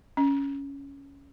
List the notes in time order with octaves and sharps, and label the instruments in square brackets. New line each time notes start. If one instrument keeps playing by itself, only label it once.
[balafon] C#4